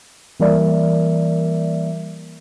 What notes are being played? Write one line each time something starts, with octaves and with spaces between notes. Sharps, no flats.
E3 G3 A#3 A#4 D5 E5